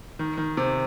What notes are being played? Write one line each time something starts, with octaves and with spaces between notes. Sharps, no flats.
D#3
D#3
C3